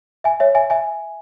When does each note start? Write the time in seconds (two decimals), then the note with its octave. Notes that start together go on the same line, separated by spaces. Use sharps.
0.24 E5 G#5
0.40 C#5 E5
0.55 E5 G#5
0.70 E5 G#5